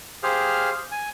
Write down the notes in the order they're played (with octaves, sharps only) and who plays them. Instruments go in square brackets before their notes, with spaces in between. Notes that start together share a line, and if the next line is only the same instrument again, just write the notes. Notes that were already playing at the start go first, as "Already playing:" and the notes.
[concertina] G4 G#4 C5 F5 F6
G#5